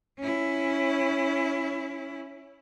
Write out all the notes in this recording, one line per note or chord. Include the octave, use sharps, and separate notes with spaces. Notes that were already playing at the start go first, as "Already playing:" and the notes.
C#4 E4